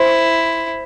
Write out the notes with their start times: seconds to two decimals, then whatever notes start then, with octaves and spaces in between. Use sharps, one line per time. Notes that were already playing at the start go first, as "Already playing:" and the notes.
Already playing: E4 C5